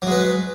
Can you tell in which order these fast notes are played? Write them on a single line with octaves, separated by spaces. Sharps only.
F#3 G#3 B4